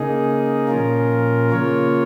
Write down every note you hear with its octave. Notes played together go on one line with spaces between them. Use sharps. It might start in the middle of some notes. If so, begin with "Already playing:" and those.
Already playing: C#3 A#3 D#4 G#4
A#2 F3 C#4 F4 A#4
C#3 A#3 F4 C#5